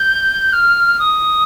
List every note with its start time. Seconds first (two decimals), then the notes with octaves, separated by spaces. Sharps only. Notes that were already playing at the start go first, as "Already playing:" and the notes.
Already playing: G6
0.53 F6
0.99 D#6